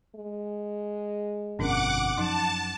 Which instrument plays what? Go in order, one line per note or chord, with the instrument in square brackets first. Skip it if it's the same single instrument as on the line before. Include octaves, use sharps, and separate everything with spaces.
[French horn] G#3
[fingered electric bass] G1 F2 B2 [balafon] C#4 D4 A#4 [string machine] F#5 D6
[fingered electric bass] F#2 [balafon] F3 D#4 [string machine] A5